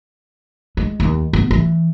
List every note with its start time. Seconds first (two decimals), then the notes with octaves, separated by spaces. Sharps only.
0.77 G#3
1.00 D#2
1.33 B3
1.51 E3